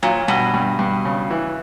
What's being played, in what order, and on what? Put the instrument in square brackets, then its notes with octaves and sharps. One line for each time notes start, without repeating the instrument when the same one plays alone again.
[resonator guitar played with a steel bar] A#2 [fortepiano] F#3
[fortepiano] G2 [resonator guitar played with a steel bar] B2
[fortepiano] G2
G2
C#3
E3